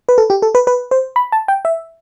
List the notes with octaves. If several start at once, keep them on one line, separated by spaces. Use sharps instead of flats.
B4
A4
G4
A4
B4
B4
C5
B5
A5
G5
E5